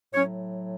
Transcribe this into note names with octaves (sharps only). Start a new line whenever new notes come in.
A2 F#3 C#4 C#5